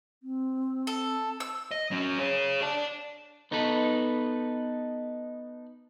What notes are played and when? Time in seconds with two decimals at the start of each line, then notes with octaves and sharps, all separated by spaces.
0.23 C4
0.87 A4
1.40 E6
1.71 D#5
1.91 F#3 C#4
2.18 G#4 C#5
2.62 D5 A5
3.51 B3 D#4 A4 B4